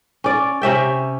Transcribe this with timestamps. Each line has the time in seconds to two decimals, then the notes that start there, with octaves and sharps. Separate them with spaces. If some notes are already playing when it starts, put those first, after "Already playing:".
0.24 C#4 D5
0.62 C3 C#4 E5 G5